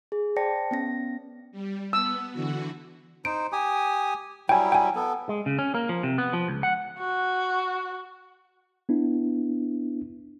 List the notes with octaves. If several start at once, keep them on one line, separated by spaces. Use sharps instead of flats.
G#4
C5 D5 G5 A5 A#6 C#7
B3 C#4 A#6
G3
B3 E6
D3 E3 F#4
D#4 C5 D7
G4 G#5 D#6
F#3 G3 E4 G5 G#5
G5 G#5
B3 A4
G#3
C#3
C#4
A#3
F3
C3
B3
F3
C#2
F#5
F#4
B3 D4 E4